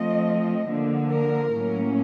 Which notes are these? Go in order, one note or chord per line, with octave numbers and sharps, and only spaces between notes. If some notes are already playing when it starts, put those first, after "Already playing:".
Already playing: F3 A3 C4 D#5
D3 F3 A#3
A#4
A2 F#3 A#3 C#4